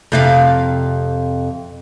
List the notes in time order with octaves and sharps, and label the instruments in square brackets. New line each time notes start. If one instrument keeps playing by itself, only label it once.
[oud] F2 C3 F5